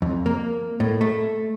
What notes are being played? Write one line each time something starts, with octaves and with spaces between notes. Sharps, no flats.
F2
A#3
A2
A3